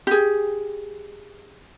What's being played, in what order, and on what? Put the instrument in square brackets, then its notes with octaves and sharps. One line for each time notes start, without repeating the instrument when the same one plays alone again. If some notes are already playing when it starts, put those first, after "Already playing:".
[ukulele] G4 G#4